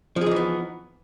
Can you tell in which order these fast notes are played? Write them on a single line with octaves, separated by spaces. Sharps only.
F3 G#4 D#4 E3 B3